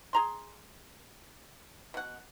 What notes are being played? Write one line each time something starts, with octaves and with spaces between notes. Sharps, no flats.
G#4 A#5 C6
B2 F#5